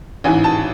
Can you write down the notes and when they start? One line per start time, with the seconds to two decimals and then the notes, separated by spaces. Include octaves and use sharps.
0.24 A1 G#2 E3 G#5
0.44 A5